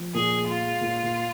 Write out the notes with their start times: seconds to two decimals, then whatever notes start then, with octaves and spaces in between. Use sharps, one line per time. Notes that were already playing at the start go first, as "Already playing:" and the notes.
Already playing: F3
0.14 A#2 G#4
0.37 G#3
0.47 F4
0.59 G#3
0.81 A#2
1.03 A#2